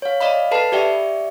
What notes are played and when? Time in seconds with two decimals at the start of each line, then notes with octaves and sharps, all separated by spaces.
0.02 C#5 F5
0.21 D5 D#5 F5 B5
0.51 A4 B4 A5 B5 C7
0.72 G4 D5 E5 G5